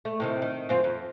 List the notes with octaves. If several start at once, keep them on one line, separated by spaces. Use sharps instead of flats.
A3
A2 C3 D#3
D#3
F#2 C4 F4
F2